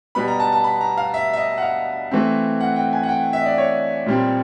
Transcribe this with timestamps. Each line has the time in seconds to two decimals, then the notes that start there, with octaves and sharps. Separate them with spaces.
0.15 B2 G3 B3 B5
0.28 A#5
0.40 A5
0.53 A5
0.64 B5
0.81 A#5
0.97 F5
1.14 E5
1.33 E5
1.37 D#5
1.58 F#5
1.62 F5
2.11 E3 A3 C4
2.61 F#5
2.76 G5
2.93 G#5
3.03 F#5
3.09 G5
3.33 E5
3.41 D#5
3.46 D5
3.58 C#5
4.06 A#2 G3 C4